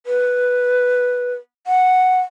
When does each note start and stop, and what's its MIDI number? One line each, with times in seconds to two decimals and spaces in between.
0.06 1.33 71
1.67 2.20 78